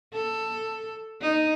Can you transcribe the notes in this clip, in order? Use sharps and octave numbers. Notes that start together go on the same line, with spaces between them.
A4
D#4